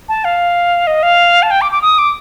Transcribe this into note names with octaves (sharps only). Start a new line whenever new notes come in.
A5
F5
D#5
F5
A5
G5
D6
D6
D#6
D6